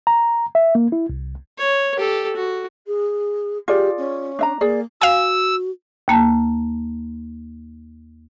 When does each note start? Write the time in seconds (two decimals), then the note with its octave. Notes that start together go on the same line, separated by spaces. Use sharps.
0.07 A#5
0.55 E5
0.75 A#3
0.92 E4
1.09 C2
1.58 C#5
1.97 G4 A4
2.36 F#4
2.87 G#4
3.68 F4 G4 G#4 D5
3.97 C#4
4.39 D4 E5 A#5
4.61 A#3 G#4 D5
5.02 F#4 F5 G#5 E6
6.08 D#2 A#3 A5